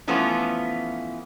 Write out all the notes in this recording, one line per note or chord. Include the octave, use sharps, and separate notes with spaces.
E3 F3 A3 B3 C#4 F4